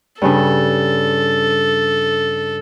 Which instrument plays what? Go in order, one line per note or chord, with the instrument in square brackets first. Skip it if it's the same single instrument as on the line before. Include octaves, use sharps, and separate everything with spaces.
[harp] G2 C#3 D4 [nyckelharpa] A4